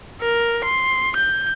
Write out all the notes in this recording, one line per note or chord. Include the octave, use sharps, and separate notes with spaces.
A#4
C6
G6